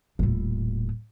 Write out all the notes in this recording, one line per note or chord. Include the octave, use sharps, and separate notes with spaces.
D#1 A2